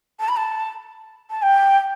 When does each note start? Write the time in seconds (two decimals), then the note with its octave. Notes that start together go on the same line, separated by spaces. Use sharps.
0.20 A5
0.28 B5
0.36 A5
1.30 A5
1.42 G5